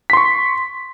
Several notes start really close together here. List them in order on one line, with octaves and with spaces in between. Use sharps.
B6 C6 C#6